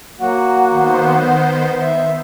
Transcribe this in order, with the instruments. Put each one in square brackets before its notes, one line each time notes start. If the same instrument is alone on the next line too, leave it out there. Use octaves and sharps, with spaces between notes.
[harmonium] F#3 A#3 F#4 [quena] F#5
[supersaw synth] D#3 B3 C5
[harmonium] E5